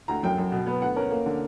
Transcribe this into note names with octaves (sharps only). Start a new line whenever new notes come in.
D2 A#5
F#2 G5
F#2
B2
B3
D2 F#5
C#4 A#4
A#3
D3